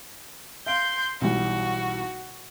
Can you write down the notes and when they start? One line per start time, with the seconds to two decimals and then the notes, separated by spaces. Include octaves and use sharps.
0.66 F5 C6 G6 D7
1.21 B1 E3 G3 F#4